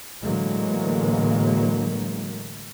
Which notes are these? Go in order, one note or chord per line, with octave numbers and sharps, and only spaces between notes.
A2 D3 E3 F#3 G#3 A#3